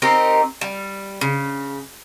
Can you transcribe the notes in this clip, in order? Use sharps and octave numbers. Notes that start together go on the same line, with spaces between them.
C4 D#4 G4 A#4
G3
C#3